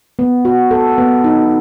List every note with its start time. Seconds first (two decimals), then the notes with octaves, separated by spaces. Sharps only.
0.19 B3
0.45 F#4
0.71 A4
0.98 B3
1.24 D#4